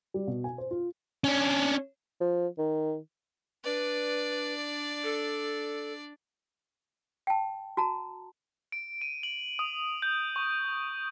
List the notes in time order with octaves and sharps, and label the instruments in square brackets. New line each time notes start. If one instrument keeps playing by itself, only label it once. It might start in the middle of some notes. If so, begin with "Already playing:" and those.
[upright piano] G3
B2
G#5
C5
F4
[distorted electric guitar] C#4 D4
[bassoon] F3
D#3
[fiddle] D4 D5 [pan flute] B4
[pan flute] A4
[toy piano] G5 A5
F#4 A5 A#5
[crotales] D7
D#7
F#7
D#6
G6
C#6